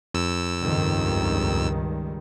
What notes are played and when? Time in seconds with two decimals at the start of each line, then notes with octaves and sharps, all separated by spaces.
0.14 F2 E6
0.64 C#2 G2 D#3